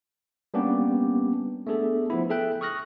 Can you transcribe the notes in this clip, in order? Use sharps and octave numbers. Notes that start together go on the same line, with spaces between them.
G3 A#3 B3 C#4 D4 G4
A3 B3 D4 G#4 A4
F3 B3 E4
G#4 A4 E5 G5 F#6
C#6 D#6 F6 F#6 A#6